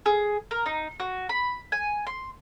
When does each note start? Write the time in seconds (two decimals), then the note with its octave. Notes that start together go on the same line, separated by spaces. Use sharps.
0.06 G#4
0.51 A#4
0.66 D#4
1.00 F#4
1.29 B5
1.72 G#5
2.07 C6